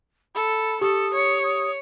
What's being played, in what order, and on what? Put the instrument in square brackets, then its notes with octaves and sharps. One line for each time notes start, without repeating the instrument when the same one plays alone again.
[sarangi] A4 [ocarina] B5
[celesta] G4 [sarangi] A4 [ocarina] D#6
[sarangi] C#5
[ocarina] D#6